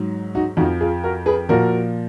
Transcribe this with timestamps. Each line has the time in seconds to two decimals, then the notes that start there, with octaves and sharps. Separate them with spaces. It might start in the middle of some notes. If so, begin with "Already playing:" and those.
Already playing: G#2 F#3
0.35 D#4 F#4
0.57 F2 D#4 F#4
0.61 F3
0.81 F4 G#4
1.03 F#4 A#4
1.26 G#4 B4
1.49 A#2 F3 F#4 A#4